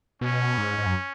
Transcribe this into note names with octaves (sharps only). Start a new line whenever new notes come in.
B2 C#4
G#2
G#2
F#2